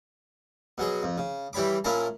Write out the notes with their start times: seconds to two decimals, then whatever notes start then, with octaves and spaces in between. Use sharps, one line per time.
0.78 B2 F#3 G#4
1.03 F2
1.18 C#3
1.53 E3 G3 C#5 B5 D6
1.84 A#2 C#4 E4 A#4 A5